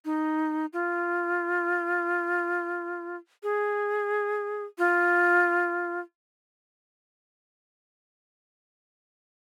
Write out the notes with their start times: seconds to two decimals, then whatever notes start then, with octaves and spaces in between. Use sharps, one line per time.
0.05 D#4
0.73 F4
3.43 G#4
4.78 F4